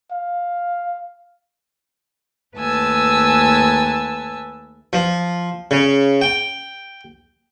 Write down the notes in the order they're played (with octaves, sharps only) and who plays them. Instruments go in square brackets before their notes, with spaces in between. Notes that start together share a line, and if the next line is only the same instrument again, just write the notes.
[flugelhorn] F5
[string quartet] D#2 A3 B4 G#5 A5 E6
[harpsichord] F3
C#3
G5